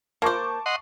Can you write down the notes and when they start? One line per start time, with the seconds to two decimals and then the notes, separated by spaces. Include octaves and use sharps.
0.22 A#3 C5 A5 C#6 D6
0.66 D#5 F#5 C6